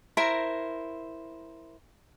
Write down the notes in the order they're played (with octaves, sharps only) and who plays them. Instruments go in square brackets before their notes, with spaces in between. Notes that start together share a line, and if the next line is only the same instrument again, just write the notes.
[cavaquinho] E4 A#4 C5 A#5